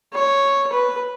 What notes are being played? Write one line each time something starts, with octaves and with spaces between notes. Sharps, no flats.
C#5
B4